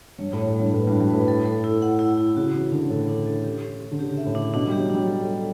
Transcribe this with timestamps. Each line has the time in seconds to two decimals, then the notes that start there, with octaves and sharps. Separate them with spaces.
0.18 G2 C#5
0.33 A2
0.37 C#5
0.47 A2
0.56 G2 G3
0.73 A2 B4
0.87 G2
0.92 F#4
1.00 G2
1.10 A2 B4
1.28 A4
1.46 A4
1.64 E4
1.82 F#5
1.99 E4
2.17 E4
2.37 C#3 F#4
2.54 E3 C#4
2.72 D3 C#4
2.90 A2 A4
3.08 D4
3.26 A4
3.44 G4
3.62 C#4
3.81 C#4
3.91 D3
3.99 C#3 G4
4.18 E5
4.26 A2
4.35 D4
4.54 B2 D4
4.67 G3
4.72 G4
4.80 F#3
4.90 G3 D4
5.07 A4
5.25 A4